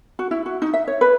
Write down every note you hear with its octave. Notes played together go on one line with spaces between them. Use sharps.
F#4
E4
F#4
D#4
E5
C#5
B4